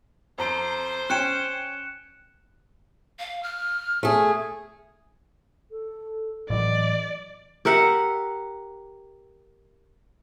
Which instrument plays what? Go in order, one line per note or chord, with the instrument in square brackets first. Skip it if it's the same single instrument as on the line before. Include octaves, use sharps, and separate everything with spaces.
[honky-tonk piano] F2 A#5 D7 [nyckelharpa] C5
[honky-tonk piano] C#4 G5 [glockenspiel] F#6 C#7 E7
[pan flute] F5
F6
[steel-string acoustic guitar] A3 G#4
[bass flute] A4
[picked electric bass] A2 E3 F#3 [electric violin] D5 [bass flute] D#5
[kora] G4 A#4 E5 F#5